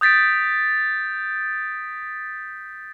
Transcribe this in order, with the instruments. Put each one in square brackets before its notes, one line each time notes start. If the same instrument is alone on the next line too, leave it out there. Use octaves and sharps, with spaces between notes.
[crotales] D#6 G6 A6 B6 D7